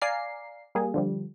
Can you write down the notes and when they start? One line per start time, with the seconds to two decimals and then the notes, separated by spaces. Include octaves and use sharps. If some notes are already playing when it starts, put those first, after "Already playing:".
0.02 D5 F5 G#5 A#5 C7
0.75 G3 A#3 G#4
0.94 D3 F3 G3